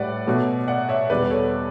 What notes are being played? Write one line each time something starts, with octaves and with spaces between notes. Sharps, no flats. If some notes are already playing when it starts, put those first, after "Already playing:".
Already playing: A2 G3 B4 D5 F#5
B2 F#3 A3
D5 F#5
C#5 E5
E2 B2 G3 B4 D5
A4 C#5